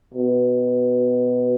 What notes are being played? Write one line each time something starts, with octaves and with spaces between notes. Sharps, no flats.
B2